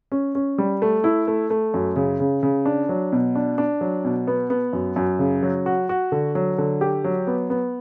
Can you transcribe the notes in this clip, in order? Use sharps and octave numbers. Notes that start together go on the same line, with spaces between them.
C#4
C#4
G3
A3
E4
A3
A3
F#2
C#3
C#3
C#3
D4
F#3
B2
D4
D4
F#3
B2
B3
B3
F#2
F#2
C#3
F#3
F#4
F#4
D3
F#3
D3
G4
F#3
B3
B3